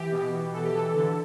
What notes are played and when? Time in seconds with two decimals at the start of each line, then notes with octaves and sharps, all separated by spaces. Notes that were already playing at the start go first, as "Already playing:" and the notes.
Already playing: E3 G4
0.12 B2
0.33 B2
0.53 E3 A4
0.64 G4
0.74 E3 A4
0.95 D3